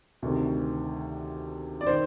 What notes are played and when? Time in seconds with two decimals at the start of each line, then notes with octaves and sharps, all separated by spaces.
0.22 D2 C3 D#3
1.81 D5
1.87 D#3 C5